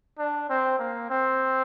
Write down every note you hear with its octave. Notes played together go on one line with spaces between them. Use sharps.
D4
C4
A#3
C4